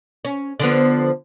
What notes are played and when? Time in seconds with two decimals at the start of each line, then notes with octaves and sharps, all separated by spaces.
0.25 C#4
0.60 D3 F3 B3